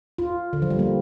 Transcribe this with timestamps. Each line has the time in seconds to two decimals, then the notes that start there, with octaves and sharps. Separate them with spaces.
0.18 F4
0.53 D3
0.62 F3
0.70 G3
0.79 A#3